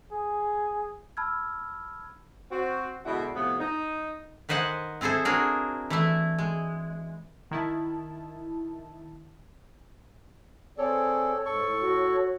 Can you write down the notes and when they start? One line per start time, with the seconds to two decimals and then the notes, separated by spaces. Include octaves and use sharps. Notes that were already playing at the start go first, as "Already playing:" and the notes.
0.12 G#4
1.17 A5 B5 E6 F6 G#6
2.51 C4 F#4
3.05 B2 D3 G#3 E4 F#4
3.35 A2 C3 F3 B3
3.60 D#4
4.49 D#3 B4 C5 D#5 F#5 G#5
5.01 C4 E4 G#4 A4 C5
5.25 D4 F#4 G#4 A#4
5.90 E3 A3 E4
6.38 G#3
7.51 D#3 E4 A5
10.78 C4 G#4 A4 C#5 D5
11.46 G#2 A4 C#6
11.64 A2
11.81 F#4